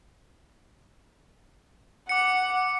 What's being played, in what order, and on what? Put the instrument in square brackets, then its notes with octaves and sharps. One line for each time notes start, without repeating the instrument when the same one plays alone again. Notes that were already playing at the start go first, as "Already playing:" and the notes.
[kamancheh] F#5 [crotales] D6 C#7